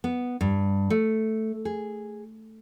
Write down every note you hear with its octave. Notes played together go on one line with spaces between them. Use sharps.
B3
G2
A3
G#4